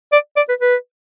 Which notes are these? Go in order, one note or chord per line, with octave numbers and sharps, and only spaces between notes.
D5
D5
B4
B4